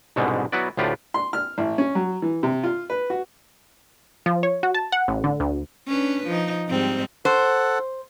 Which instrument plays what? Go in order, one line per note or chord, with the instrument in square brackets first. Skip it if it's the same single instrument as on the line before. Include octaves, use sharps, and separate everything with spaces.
[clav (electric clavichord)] C2 G#2 B2 D3 G3 G#3
F#3 B3 E4 F#4 B4 D5
D2 A2 F4 G4 B4 D5
[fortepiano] C6
F6
A1
C#4
F#3
E3
C3
F4
B4
F#4
[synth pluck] F3
C#5
F#4
A5
F#5
A1
D3
D2
[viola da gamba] C#4 D4 B4
F3 D#4
G#2 G3 C4
[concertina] A4 F#5 [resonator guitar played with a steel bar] C5